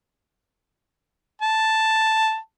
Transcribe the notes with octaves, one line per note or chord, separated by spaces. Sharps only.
A5